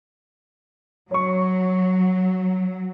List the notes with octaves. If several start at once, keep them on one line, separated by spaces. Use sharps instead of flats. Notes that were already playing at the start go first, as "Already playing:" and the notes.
F#3 C#5 C#6